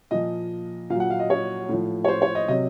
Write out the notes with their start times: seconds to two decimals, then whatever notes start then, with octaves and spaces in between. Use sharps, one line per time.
0.11 A#2 F3 D#5
0.90 A#2 F5
0.95 F#3
1.00 F#5
1.10 F5
1.20 D#5
1.30 C#5
1.69 A2 F3
2.04 C#5
2.08 C5
2.22 C#5
2.35 D#5
2.48 C3 F#3 D#5